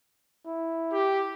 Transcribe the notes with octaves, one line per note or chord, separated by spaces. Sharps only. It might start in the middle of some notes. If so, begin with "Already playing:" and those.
E4
G4